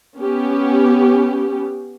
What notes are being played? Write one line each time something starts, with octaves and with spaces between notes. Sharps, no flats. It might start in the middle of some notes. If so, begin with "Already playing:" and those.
B3 C#4 G4